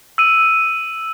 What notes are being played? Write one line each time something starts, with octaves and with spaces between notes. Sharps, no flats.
E6 D#7